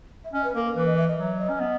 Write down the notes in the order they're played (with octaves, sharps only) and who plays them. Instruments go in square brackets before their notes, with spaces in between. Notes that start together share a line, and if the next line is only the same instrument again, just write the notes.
[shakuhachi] E5
[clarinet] C#4 [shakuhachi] D#5
[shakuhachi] B4
[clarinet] A#3 [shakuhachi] A#4
[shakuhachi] A#4
[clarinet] E3 [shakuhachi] B4
[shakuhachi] D#5
E5
D#5
[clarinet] F#3 [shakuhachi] E5
[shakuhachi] D#5
[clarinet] C#4
B3